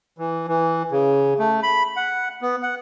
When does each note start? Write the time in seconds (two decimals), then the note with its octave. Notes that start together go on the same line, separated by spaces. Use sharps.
0.18 E3
0.48 E3
0.91 C#3
1.39 A3
1.63 B5
1.96 F#5
2.41 B3
2.63 F#5